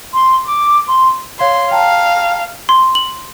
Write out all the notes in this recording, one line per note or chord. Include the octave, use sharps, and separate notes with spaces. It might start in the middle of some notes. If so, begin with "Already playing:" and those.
C6
D6
C6
C#5 F5 C6 G#6
F5 G5 A5 A#5
C6
F#7